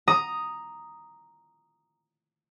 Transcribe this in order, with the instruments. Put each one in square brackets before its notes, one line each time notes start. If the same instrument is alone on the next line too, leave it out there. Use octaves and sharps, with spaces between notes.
[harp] A#5 D#6